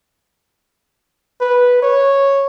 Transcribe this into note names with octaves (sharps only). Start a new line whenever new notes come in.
B4
C#5